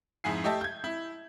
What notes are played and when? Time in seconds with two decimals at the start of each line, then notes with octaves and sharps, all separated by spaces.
0.24 F2 G#2 E4 G#5 C7
0.44 A3 G4 D#5 E5 A5
0.61 G6 G#6
0.84 E4